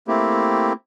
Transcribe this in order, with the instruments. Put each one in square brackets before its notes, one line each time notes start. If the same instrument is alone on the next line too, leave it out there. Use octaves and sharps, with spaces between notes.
[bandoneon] A3 A#3 C4 E4 G4